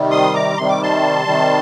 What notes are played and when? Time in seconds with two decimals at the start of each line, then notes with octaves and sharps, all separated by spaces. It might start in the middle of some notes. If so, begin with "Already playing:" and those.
Already playing: C3 D#3 G3
0.11 C6 D#6
0.34 A#5 D6
0.57 C3 D#3 G3 C6
0.69 D6
0.83 A5 C6
1.25 C3 D#3 G3